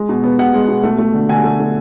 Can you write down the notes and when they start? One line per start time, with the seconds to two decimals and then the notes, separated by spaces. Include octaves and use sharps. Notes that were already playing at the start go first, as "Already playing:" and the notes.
Already playing: G#3
0.09 B2
0.24 B3
0.39 B2 F#5
0.54 G#3
0.68 B2
0.83 A3
0.98 A3
1.14 D3
1.29 D3 G#5
1.44 A3
1.60 A3